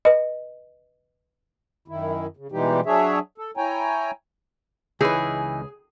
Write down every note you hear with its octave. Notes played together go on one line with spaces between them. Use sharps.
B4 D#5
F#2 D#3 E4
C#3
B2 E3 G3 G#3 D#4 G4
F#3 D4 G#4 C#5 E5
A4
E4 C#5 G5 G#5 A#5
C#2 E3 D#4 E4 G#4 B4 G#5